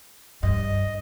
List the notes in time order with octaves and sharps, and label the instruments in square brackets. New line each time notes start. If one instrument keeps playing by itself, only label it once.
[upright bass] G2 [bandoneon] D#5